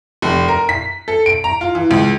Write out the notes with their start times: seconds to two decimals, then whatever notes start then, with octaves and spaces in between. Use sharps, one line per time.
0.22 F1
0.48 A#4
0.69 B6
1.08 A4
1.26 D7
1.44 A#5
1.61 F4
1.75 E3
1.91 C#2